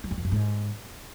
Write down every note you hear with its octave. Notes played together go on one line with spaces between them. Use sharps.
F#3
F#2
F2
F#2
G#2